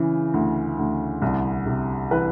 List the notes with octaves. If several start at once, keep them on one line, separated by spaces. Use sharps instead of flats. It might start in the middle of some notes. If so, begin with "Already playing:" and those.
Already playing: C#3 E3
D2
D2
C2
C3
E3 B4